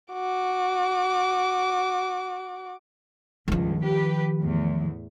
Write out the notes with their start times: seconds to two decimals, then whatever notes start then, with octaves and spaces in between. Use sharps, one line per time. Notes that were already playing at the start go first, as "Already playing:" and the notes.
0.13 F#4 D6
3.48 C#2 G2 D#3 F3
3.83 G4 B4
4.38 E2 A2